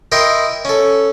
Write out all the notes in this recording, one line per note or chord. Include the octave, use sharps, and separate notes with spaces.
E4 A#4 D#5 G5 C6
C#4 A4